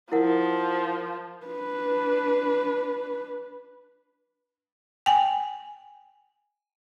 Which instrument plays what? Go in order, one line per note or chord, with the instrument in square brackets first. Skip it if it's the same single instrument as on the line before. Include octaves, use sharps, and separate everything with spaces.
[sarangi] F3 [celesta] E4 A#4 F#5
[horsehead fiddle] D4 B4
[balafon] G5 G#5